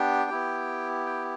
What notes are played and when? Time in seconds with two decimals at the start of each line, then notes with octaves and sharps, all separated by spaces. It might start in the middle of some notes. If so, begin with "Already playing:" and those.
Already playing: B3 D4 G4 G5
0.30 B3 E4 G4
1.06 G5